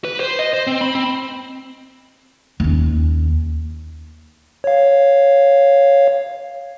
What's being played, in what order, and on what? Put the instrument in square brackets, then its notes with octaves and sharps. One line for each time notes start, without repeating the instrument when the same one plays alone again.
[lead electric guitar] B4
C5
D#5
C5
C4
B5
C4
[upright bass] D#2 C#4
[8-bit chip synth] C#5 F5